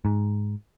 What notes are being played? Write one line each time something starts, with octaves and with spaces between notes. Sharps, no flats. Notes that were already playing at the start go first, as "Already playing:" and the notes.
G#2